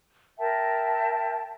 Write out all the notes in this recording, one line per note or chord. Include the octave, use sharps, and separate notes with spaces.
A#4 E5 G5 A5